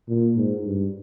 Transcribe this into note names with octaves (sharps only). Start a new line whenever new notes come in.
A#2
G#2
G2